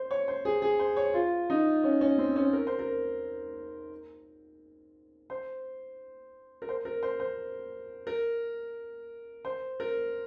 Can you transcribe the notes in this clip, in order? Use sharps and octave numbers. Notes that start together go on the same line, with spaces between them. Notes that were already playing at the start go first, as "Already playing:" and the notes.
Already playing: C5
C#5
C5
G#4
G#4
C5
C#5
F4
D#4
C#4
C#4
C4
C#4
A#4
C5
A#4
C5
A#4
C5
A#4
C5
C5
A#4
C5
A#4